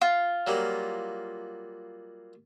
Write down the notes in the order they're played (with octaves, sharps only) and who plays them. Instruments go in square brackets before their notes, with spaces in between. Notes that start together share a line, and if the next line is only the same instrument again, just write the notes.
[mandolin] F4
[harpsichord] F#3 G3 A#3